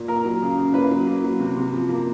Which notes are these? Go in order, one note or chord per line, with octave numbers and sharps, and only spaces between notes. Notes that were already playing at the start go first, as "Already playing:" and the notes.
Already playing: A#2
A#3 A#4
F#3
C#3
C#3
A#3 B4
F#3
A#3
F#3
C3
C3
F3
A#3